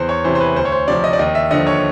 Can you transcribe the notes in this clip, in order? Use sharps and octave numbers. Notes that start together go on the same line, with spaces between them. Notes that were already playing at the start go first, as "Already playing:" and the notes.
Already playing: E2 C5
C#5
C3 E3 C5
C5
B4
D2 C5
C#5
C5
C3 F3 D5
D#5
D5
D#2 D#5
E5
D3 F3 D#5
C#5